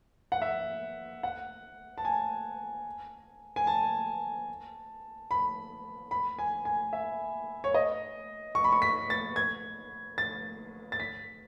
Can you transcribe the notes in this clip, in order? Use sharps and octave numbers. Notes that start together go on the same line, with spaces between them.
F#5
E5
F#5
A5
G#5
G#5
A5
B5
B5
G#5
G#5
E5
C#5
D#5
C#6
B5
C#6
B6
A6
G#6
A6
A6
B6